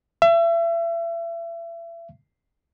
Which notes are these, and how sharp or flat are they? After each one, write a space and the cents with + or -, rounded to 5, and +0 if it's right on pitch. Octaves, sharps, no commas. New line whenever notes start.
E5 +35